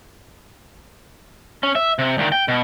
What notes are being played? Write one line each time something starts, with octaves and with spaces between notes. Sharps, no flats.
C#4
E5
C3
D2 D#3
G5
B2